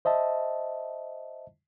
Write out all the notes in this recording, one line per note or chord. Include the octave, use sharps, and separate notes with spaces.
C5 D#5 E5 A5